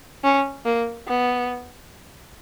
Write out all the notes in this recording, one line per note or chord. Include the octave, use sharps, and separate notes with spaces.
C#4
A#3
B3